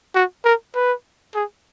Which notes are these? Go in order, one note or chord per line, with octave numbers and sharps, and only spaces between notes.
F#4
A#4
B4
G#4